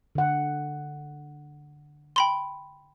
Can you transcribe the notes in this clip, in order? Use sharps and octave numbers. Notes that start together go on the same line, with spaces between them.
D3 F#5
G5 B5 C6